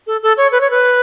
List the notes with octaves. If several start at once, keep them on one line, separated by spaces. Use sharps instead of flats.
A4
A4
C#5
B4
C#5
B4